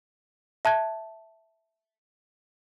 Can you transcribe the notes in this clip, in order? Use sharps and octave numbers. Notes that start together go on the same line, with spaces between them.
E5 A5 F#6 G#6